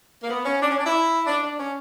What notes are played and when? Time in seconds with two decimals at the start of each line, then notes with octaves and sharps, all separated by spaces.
0.23 A#3
0.30 B3
0.45 C#4
0.61 D4
0.69 C#4
0.77 D4
0.86 E4
1.26 D4
1.42 D4
1.58 C#4